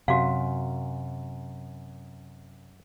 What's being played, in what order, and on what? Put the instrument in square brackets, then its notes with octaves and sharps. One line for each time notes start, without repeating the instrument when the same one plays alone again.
[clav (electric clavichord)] F#2 [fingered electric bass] C3 [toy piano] F#4 F5